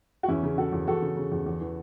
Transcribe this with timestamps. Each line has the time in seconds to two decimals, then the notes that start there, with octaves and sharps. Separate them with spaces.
0.23 F#4
0.28 E2 C#4 E4
0.43 C#3
0.58 C#3 F#4 A4
0.72 E2
0.87 E2 F#4 A4
1.02 C#3
1.17 C#3
1.32 E2
1.46 E2
1.61 E3